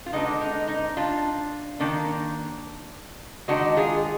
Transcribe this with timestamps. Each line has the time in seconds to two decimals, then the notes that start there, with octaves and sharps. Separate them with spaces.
0.06 F4
0.12 D3 G#3 B3 D4 D#4
0.41 D#4
0.68 D#4
0.97 D4 F4
1.80 D#3 A#3 D4
3.48 D#3 G#3 D4 D#4 F#4
3.77 F4 G#4